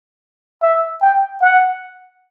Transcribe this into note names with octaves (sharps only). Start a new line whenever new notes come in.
E5
G5
F#5